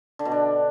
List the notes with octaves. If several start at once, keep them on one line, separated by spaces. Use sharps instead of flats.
D3
B2
D4